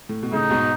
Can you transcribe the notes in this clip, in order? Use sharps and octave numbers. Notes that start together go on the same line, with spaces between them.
A2
B2
A2 C#3 D#4
G#2 B2